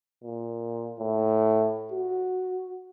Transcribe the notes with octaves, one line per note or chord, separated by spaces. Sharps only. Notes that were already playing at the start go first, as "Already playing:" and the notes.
A#2
A2
F#4